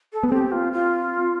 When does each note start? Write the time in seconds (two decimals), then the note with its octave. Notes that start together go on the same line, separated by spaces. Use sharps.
0.13 A4
0.23 B3
0.28 A4
0.32 C4 G4
0.52 F4
0.73 F4